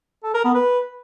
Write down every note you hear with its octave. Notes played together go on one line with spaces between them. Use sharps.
A4
A#4
B3
B4